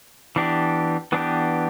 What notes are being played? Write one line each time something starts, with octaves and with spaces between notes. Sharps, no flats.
E3 B3 D4 G4
E3 B3 D4 G4